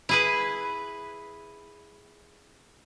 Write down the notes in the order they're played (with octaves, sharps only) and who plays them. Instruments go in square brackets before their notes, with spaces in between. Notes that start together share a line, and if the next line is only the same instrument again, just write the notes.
[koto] E4 G#4 B4